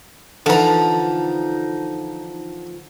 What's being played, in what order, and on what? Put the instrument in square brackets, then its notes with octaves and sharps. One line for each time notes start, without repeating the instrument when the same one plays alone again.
[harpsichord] D3 E3 [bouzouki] F3 A#5 [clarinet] D#4